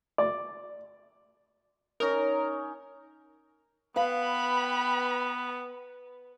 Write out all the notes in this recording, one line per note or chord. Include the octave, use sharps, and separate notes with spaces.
D5
C#4 D#4 A#4
B3 B4 F5 G5 B5